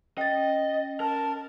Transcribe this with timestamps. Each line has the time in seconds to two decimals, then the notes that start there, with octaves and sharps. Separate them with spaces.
0.18 C#4 D#5 G5 A6
1.00 A#4 A5